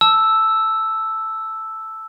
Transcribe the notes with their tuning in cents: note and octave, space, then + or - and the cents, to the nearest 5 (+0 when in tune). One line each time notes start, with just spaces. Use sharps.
A5 +0 E6 +0